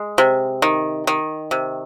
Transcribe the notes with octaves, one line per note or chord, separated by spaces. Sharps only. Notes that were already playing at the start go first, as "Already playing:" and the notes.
Already playing: G#3
C3
D#3
D#3
C3